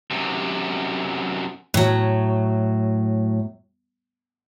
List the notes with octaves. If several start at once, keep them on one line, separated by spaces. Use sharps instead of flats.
F#2 C3
A2 F#3